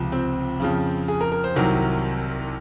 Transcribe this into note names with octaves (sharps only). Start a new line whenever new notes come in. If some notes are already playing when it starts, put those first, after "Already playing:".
Already playing: C#2 C3 F3
C4
F2 C#3 F3
G#4
A#4
A#4
C5
C2 C3 D#3 F#3 A#4